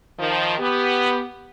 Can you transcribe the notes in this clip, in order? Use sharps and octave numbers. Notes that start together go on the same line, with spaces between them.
D#3 F3
B3 G4